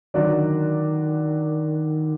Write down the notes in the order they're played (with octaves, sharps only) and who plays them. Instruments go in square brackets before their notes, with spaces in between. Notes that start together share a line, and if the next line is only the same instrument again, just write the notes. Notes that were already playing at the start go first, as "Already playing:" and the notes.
[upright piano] D3 F#3 D4 F#4 D5 [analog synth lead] D#3